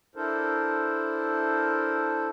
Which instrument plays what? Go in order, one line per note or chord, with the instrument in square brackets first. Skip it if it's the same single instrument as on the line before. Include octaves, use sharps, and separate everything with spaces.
[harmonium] D4 E4 A4 A#4 C5